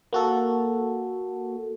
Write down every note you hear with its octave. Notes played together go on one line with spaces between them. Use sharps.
A#3 F#4 A4